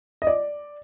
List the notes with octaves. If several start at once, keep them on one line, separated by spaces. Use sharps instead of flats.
D#5
D5